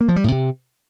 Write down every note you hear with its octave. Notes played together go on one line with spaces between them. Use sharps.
A#3
F3
G3
A2
C3